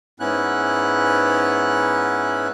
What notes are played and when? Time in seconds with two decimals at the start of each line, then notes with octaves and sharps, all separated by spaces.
0.20 G#2 B3 C#4 E4 F#6